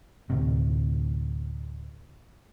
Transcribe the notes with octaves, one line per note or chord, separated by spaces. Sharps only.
D2 A2 C3